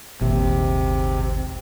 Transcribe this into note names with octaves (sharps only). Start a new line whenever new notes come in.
D#1 G#1 D#2 G#2 C3